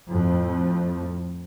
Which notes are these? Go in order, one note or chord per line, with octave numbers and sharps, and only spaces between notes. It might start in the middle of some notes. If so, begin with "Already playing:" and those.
F2 A2